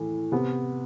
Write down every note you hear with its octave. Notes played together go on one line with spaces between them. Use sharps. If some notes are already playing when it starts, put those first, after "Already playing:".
Already playing: A2 E3
C3 B3